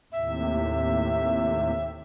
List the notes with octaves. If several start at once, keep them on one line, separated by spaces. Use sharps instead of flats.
D#2 A2 C3 E5